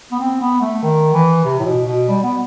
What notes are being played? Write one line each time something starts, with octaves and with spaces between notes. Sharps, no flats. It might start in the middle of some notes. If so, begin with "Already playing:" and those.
B3
C4
B3
A3
D#3
E3
C3
A2
B2
B2
G3
B3